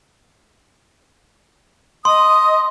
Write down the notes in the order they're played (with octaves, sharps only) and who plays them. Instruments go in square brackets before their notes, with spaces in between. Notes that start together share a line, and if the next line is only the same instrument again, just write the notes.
[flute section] D#5 D#6 [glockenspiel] C6